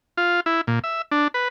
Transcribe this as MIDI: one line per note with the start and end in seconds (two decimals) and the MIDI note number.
0.17 0.40 65
0.46 0.61 64
0.67 0.79 46
0.84 1.02 76
1.11 1.28 62
1.34 1.48 71